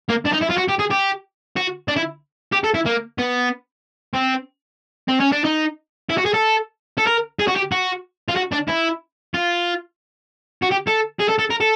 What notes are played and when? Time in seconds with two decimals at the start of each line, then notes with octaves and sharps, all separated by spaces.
0.10 A#3
0.26 D4
0.34 D#4
0.42 E4
0.51 F4
0.58 F#4
0.69 G4
0.80 G#4
0.91 G4
1.56 F#4
1.88 D4
1.96 E4
2.53 G4
2.64 A4
2.74 E4
2.86 A#3
3.18 B3
4.15 C4
5.09 C4
5.20 C#4
5.32 D4
5.45 D#4
6.10 E4
6.18 F#4
6.26 G#4
6.34 A4
6.98 A4
7.07 A#4
7.40 G#4
7.48 F#4
7.56 G4
7.72 F#4
8.29 F4
8.37 F#4
8.53 D4
8.69 E4
9.34 F4
10.63 F#4
10.72 G4
10.88 A4
11.20 G#4
11.29 A4
11.39 A4
11.51 A#4
11.61 A4